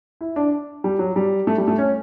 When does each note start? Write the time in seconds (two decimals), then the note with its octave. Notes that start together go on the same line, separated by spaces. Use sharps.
0.21 E4
0.36 D4
0.84 G3
0.99 F#3
1.16 G3
1.47 A3
1.58 G3
1.68 A3
1.78 C#4